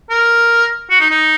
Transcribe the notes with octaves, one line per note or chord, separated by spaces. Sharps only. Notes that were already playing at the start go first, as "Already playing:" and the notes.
A#4
F#4
D#4
D#4